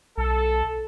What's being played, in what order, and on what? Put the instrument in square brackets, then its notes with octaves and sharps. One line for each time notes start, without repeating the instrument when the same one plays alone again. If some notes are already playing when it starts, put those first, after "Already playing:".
[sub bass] B1 [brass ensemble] A4